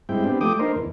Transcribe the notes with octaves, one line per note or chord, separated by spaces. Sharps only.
G2 G#3 C4 E4 G5
B3 C4 D4 G4
F3 A3 G5 D6 D#6
A#3 D4 D#4 A#4 C5
E2